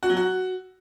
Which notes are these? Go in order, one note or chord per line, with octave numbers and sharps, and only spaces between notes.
F#4
F#3
F#4